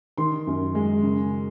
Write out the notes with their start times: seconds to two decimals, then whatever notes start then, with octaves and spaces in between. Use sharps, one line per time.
0.18 D#3 C6
0.47 F#2
0.75 G#3
1.03 C#3